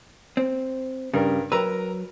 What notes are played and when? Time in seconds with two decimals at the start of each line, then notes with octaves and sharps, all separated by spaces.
0.37 C4
1.14 G2 C#3 G3 A#4
1.52 F#3 A#4 B4 A#5 E6